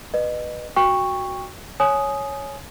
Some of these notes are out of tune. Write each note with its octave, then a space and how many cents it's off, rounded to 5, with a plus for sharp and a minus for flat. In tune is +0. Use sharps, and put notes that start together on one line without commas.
B4 +0 D#5 -30
F#4 +0 G5 +20 C#6 +0
C#5 +0 G#5 +25 D#6 +0